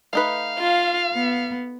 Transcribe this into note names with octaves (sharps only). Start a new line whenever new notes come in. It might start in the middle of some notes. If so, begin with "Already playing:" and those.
A3 D#4 B4 F5
F4
B3